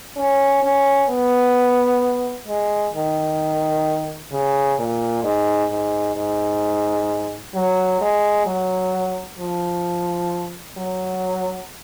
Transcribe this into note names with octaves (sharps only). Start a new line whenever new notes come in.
C#4
C#4
B3
G#3
D#3
C#3
A#2
G#2
G#2
G#2
F#3
G#3
F#3
F3
F#3